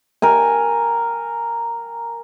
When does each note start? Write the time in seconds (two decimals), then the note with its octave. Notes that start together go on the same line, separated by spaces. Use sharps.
0.22 A#4 G5 G#5